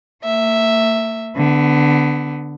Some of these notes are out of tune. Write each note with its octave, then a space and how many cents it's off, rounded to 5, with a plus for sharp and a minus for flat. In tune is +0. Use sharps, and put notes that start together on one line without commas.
A#3 -45 E5 +0
D3 +0 B3 +20